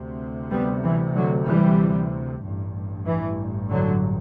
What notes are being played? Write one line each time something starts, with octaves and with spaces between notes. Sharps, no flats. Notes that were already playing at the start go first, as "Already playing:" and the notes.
Already playing: D2 C3
G3 B3
E3
D3 F#3
E3 G3
A1 G2
E3
D3 F#3